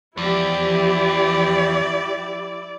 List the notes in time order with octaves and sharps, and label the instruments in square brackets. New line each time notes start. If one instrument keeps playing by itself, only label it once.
[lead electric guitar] E2 [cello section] F3 G4 [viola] E4 D5